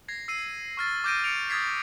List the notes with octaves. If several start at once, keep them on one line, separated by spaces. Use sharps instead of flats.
G#6 A#6 C7
E6 C7 D#7
C#6 F6 A6
D6 F6 G6 A#6 D7 D#7
C#7 D7 F7
D#6 F6 G#6 A6 B6 C7